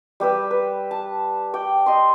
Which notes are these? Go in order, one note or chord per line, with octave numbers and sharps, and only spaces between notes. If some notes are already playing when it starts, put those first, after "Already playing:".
G3 G4 B4 E6
B4
A5
D5 G5
D#5 C6